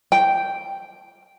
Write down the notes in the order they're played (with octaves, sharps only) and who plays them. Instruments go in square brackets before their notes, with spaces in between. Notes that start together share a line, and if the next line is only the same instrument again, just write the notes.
[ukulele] G5